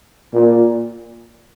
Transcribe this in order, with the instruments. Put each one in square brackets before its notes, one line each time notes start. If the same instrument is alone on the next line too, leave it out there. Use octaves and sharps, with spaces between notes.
[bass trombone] A#2